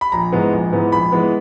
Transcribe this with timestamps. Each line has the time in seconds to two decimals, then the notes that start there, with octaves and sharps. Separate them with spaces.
0.01 B5
0.12 A#1 A#5
0.32 G#2 E3 G#3 B3
0.52 A#1
0.73 G#2 E3 G#3 B3
0.92 A#1 B5
1.12 E3 G#3 B3